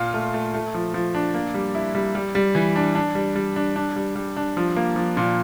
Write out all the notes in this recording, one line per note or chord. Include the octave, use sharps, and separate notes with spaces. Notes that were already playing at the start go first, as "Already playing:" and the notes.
Already playing: A#2 F4
A3
A3
A3
F3
F3
D4
A#3
G3
E4
G3
G3
G3
E3
D4
D4
G3
G3
D4
D4
G3
G3
D4
F3
A#3
F3
A#2